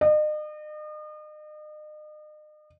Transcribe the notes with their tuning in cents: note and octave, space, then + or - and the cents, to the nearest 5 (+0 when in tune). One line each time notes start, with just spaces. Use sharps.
D#5 -40